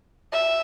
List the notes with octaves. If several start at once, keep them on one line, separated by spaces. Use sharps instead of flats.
E5